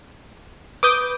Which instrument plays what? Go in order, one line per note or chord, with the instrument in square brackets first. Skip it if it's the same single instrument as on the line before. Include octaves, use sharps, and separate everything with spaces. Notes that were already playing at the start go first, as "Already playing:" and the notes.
[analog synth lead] B4 [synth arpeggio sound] D6 D#6 G6